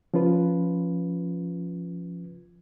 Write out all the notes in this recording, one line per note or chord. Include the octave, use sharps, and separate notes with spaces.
F3 C#4 F4 B4